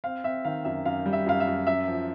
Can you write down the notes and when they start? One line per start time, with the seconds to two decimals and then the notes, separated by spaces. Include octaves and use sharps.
0.04 C4 F5
0.24 C4 E5
0.45 D#3 F5
0.65 F#2 E5
0.86 F#2 F5
1.06 G3
1.13 E5
1.26 F#2 F5
1.40 E5
1.47 F#2
1.67 F#2 E5
1.88 F3